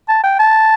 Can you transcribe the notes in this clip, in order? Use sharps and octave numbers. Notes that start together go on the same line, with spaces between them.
A5
G5
A5